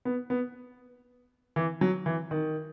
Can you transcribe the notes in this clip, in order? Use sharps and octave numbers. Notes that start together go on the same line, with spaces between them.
B3
B3
E3
F#3
E3
D#3